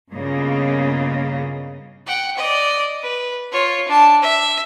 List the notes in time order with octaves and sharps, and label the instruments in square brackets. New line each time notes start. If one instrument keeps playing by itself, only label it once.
[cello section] G2 A#2 C#3 A#3 B3 D#5
[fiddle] F#5 G5
D5 D#5
B4
F4 C#5
D4 A5
E5